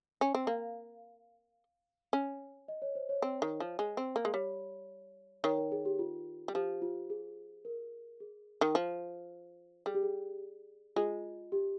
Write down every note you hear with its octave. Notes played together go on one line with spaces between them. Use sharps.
C#4
C4
A#3 F5
C#4
D#5
C#5
C5
C#5
C4
D#3
F3
G#3
C4
A#3
G#3
G3 C#5
D#3 C#5
A#4
G#4
G4
F4
G3
F3 G4
F4
G#4
A#4
G#4
D#3
F3
G3 G#4
G4
G#4
G#3 F4
G4